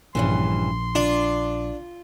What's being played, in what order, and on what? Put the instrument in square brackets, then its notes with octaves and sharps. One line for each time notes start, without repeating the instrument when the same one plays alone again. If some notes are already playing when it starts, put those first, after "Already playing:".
[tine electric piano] A#1 [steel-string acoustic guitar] G2 C#3 E3 [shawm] C6
[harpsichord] D4 [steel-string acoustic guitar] F4